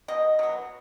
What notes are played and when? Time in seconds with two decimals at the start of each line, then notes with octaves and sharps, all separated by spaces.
0.08 B2 D#5
0.39 F#3 B3